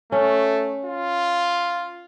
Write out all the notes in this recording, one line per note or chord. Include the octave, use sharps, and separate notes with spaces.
A3 C#4
F4